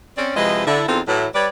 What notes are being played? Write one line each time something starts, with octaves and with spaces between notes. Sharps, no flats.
C4 C#4 D5
C3 F3 G#3 E4 B4 D#5
D3 E4
E2 C4 D#4 F4 A4
A2 E3 F#3
G3 B4 C#5 D5